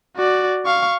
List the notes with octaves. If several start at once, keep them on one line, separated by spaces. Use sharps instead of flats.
F#4 D5
F5 C#6